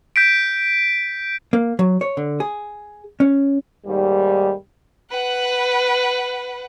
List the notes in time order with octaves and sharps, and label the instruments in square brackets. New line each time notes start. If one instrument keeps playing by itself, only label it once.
[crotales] G6 B6 D7
[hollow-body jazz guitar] A#3
F#3
C#5
D3
G#4
C#4
[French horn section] D#2 G#2 G3
[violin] B4 F#5